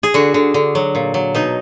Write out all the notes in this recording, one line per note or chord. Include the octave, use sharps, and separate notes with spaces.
G#4
D3 F#4
D3
D3
F#3
A#2
F#3
B2 D#4